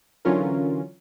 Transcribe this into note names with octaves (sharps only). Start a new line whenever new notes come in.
D3 E3 F#3 C#4 F4 A#4